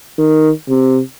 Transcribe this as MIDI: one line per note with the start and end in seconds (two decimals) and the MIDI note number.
0.18 0.50 51
0.69 1.00 48